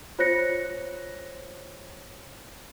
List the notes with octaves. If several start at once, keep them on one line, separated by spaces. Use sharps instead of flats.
F4 C5 C#5 F#6 A#6 C#7